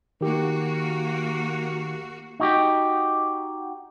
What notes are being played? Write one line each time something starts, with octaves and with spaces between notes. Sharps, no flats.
D#3 A#3 F#4 G4
D#4 F#4 G4